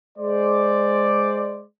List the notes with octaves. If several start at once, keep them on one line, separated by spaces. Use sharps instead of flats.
G#3 C5 D5